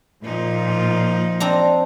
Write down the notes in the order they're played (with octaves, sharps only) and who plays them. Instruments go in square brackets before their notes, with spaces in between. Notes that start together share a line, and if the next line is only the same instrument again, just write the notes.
[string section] A#2 [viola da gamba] F3 D#4 F4
[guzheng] C4 D4 A#5